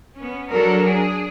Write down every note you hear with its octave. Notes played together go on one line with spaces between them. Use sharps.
B3 C#4
F#3 D4 F#4 A4 A#4
D4 G#4